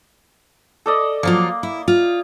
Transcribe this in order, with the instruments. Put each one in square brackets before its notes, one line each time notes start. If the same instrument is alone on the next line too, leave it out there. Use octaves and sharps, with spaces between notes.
[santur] A4 D5 D#5
[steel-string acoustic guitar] F3 F#3 F4 [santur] A#3
[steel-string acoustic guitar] E4
F4